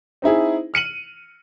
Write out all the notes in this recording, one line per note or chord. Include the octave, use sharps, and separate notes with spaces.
C4 D#4 E4 G#4
F6 C#7 D#7 F#7